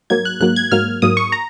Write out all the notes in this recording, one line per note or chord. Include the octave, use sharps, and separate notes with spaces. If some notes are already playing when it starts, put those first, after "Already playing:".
G#2 F#3 A#3 G#6
F#6
G#2 F#3 A#3 F#6
G#6
G#2 F#3 A#3 F6
G#2 F#3 A#3 D#6
C#6
A#5